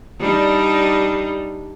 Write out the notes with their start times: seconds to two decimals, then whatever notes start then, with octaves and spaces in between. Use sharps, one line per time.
0.20 G3 D4 D#4